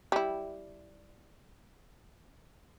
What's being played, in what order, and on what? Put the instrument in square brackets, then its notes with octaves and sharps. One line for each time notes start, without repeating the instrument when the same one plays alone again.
[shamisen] G3 E4